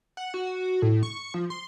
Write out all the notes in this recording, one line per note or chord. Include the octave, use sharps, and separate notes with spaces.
F#5
F#4
A2
C#6
F3
C6